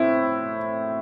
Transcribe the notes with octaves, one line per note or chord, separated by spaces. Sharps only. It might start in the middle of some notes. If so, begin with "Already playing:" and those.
Already playing: A2 C4 E4